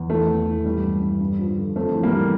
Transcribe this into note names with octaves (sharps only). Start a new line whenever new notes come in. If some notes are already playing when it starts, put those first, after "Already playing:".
Already playing: E2
E3 A3
E2
E3
E3 G3
G2
G2
G2
F3
D3
F2 A3
E3
G3 A#3
E3